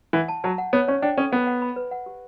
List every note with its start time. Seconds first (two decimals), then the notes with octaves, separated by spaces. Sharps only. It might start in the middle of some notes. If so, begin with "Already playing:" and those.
0.13 E3 F#5
0.28 A5
0.44 F#3 A5
0.58 F#5
0.73 B3 C#5
0.88 C#4 C#5
1.02 D4 G5
1.17 C#4 A4
1.32 B3 F#5
1.47 F#5
1.62 B5
1.76 B4
1.91 F#5
2.06 G4